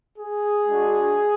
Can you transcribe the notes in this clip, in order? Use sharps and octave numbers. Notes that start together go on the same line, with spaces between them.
G#4
G#3 D4 F#4